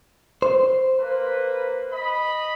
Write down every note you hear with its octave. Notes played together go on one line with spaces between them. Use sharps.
C5
A#3 B4
D#5 B5